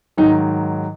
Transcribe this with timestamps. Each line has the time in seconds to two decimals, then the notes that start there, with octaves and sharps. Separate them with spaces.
0.17 G#2 D#3 F#3 D#4